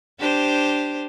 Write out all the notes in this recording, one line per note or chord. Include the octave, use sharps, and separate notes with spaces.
D4 G4 C5